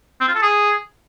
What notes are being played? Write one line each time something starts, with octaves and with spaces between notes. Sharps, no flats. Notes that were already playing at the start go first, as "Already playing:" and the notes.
C4
F4
A4
G#4